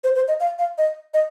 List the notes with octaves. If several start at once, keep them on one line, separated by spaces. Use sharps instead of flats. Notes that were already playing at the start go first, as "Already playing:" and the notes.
C5
C5
D#5
F5
F5
D#5
D#5